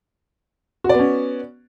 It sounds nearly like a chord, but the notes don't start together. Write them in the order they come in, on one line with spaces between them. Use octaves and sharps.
F#4 D5 B3 C#4